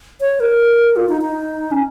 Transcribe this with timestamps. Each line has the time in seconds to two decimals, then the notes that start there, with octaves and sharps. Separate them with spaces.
0.21 C#5
0.40 A#4
0.96 F4
1.09 D#4
1.21 D#4
1.71 C#4